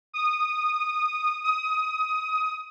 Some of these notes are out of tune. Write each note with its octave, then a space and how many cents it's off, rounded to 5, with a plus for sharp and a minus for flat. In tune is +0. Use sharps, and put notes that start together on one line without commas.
D#6 -15
D#6 +20